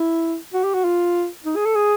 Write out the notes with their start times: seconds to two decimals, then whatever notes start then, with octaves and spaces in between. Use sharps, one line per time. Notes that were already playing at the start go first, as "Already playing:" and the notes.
Already playing: E4
0.54 F#4
0.64 G4
0.74 F#4
0.84 F4
1.45 D#4
1.56 G#4
1.66 A4
1.76 G#4